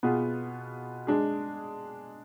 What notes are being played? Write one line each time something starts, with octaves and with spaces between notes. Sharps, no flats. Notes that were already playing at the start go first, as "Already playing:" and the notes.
B2 B3 F4 G#4
G#3 D4 G#4